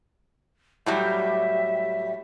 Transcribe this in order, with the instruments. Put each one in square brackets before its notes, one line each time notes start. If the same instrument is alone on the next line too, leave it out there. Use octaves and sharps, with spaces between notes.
[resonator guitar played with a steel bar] A2 F#3 G3 [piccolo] E5